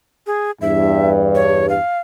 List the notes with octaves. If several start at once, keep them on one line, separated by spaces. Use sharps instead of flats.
G#4
E2 G2 E5
C#5
F5